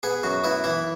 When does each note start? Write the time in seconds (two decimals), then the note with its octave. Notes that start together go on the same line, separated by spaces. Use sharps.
0.03 B3 G#4
0.23 F#2 F#4
0.44 B3 E4
0.64 E3 E4